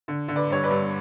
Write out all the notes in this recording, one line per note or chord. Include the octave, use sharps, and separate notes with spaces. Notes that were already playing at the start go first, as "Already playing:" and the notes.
D3
D3
B4 D5
G2 C#5
B4 D5
G2